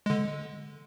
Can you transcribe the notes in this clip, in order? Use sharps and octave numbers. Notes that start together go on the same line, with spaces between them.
D3 G#3